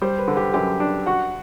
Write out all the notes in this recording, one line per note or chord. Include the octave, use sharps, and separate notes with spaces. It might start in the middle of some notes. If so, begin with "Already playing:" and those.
G3 C5
B4
D3
G4
F#2 G4
D4
F#4 F#5